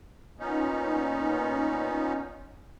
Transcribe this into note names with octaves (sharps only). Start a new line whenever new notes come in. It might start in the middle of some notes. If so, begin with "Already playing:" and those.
A#2 B3 C#4 D#4